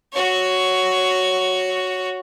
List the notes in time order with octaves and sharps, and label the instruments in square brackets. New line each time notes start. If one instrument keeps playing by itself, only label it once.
[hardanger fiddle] F#4 C#5